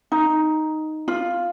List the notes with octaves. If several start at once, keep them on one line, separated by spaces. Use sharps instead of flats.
D#4
F4